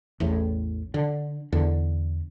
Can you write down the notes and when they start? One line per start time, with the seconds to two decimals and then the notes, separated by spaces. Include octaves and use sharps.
0.20 A1 E2 A2
0.94 D3
1.53 E2 D3